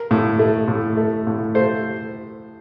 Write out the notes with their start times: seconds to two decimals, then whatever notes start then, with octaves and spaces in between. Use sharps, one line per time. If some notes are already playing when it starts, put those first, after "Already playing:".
Already playing: A#4
0.11 A2
0.39 A3
0.68 A2
0.97 A3
1.27 A2
1.55 A3 C5